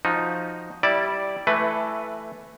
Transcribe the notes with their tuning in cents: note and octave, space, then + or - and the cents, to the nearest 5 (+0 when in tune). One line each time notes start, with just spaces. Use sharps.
F3 +0 D#4 +0 F#4 +0
G3 -10 E4 -10 D5 +0
E3 +15 A3 -5 B4 +0